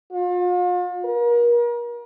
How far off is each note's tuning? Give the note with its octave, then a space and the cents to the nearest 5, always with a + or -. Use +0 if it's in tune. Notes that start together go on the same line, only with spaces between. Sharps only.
F4 +40
A#4 +40